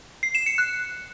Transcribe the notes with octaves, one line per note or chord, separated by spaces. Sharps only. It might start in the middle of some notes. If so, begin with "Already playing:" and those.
C7
E7
C#7
F#6